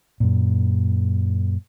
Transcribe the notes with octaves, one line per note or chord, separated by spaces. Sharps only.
F#2 A#2